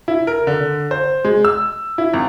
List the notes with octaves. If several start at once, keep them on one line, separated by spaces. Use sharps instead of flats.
E4
A#4
D3
C5
G#3
E6
E4
G#1